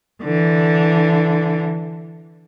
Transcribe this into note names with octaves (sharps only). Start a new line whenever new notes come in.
D3 E3